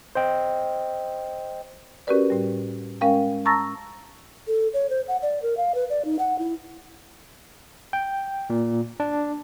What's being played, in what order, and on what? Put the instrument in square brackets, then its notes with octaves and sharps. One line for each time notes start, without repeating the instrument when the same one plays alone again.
[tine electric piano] C5 D#5 G5
[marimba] C#4 F#4 G4 A#4 B4 D5
A2 G3
G#3 C#4 A#4 F5 G5
A5 A#5 C#6 E6 A6 A#6
[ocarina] A4
C#5
C5
F#5
D5
A#4
F5
B4
D5
D#4
F#5
E4
[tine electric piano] G5
A#2
D4